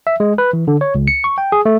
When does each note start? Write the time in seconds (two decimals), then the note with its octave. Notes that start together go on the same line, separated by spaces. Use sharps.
0.07 E5
0.20 G#3
0.38 B4
0.53 E3
0.68 D3
0.81 C#5
0.95 C#2
1.08 C#7
1.24 C#6
1.38 G5
1.52 G#4
1.65 A3